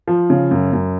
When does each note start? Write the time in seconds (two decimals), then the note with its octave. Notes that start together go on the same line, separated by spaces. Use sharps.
0.07 F3
0.30 C#3
0.51 F#2
0.73 F#2